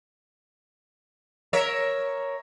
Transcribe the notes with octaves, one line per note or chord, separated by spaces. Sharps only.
A#4 C#5 E5